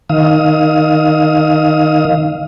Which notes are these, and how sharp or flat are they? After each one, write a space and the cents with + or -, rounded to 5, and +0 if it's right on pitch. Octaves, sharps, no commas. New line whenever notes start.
D#3 +0 F5 +0 D#6 +30